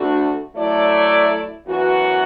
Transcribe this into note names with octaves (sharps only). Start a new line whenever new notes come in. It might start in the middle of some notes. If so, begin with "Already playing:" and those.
Already playing: D2 D3 A3 D4 F#4
F#3 A3 E4 A4 D5
F#2 E3 B3 F#4